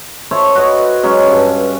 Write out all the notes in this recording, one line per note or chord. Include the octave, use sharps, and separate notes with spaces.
A4 C5 C#5 E5
F#4 B4 C5 D#5
F#3 G#3 C#4
G2 A4